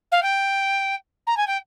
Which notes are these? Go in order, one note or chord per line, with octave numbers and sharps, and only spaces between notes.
F5
G5
A#5
G#5
G5